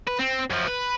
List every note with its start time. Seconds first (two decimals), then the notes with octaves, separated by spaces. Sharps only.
0.07 B4
0.19 C4
0.50 F#2 F3
0.67 B4